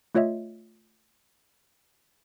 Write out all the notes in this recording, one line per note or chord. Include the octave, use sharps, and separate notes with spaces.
A3 F4 C#5 D#5 E5